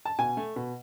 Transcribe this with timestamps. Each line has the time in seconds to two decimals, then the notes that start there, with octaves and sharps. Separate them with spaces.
0.05 A5
0.19 B2 G#5
0.37 A3
0.56 B2